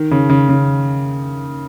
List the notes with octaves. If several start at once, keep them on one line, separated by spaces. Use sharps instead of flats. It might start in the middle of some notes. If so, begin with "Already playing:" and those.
Already playing: D#3
C#3
C#3
C#3